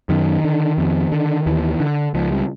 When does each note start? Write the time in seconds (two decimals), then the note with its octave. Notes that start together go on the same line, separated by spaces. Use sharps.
0.09 F#2 D#3
0.44 D3
0.78 F2
1.12 D3
1.46 D#2 E3
1.80 D3
2.14 C#2 F3
2.32 G3